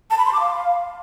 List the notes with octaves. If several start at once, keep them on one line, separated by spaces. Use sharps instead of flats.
A5
B5
C6
D6
F5